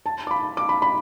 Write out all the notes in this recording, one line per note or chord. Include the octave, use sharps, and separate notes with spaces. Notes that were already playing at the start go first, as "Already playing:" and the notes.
A5
D6
B5
D6
B5
B5